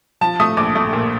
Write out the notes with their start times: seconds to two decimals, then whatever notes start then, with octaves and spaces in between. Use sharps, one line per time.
0.21 F3 A5
0.40 A3 D#6
0.57 A#1 D6
0.75 A3
0.93 A#2